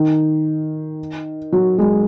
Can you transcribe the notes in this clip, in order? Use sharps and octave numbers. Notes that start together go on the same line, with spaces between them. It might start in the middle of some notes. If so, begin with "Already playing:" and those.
Already playing: D#3
F#3
G#3